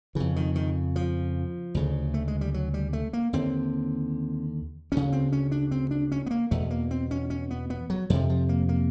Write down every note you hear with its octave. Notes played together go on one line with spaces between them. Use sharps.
F2 C#3 E3
D#3
D#3
F3
D2 C#3
A3
G#3
G3
F#3
G3
A3
A#3
D#2 D3 C4
D2 C#3 C#4
C4
C#4
D4
C4
D4
C#4
B3
A#3
E2 B2 A3
A#3
C4
C#4
C#4
B3
B3
F#3
F2 C3 F3
F3
A#3
A#3